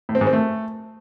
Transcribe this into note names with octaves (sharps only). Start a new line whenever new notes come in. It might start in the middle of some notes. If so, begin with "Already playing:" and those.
A2
C4
G#2
C4
A3